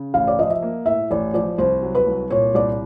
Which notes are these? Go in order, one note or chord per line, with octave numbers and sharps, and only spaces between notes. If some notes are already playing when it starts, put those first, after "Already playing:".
Already playing: C#3
A1 F5
D5
F3 D#5
E5
A#3
A2 E5
A1 D5
F3 D5
C2 C5
F#3
B4
C2
A#2 C#5
C2 D5